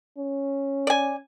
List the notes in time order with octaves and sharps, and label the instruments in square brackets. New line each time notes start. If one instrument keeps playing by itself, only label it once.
[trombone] C#4
[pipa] D5 G#5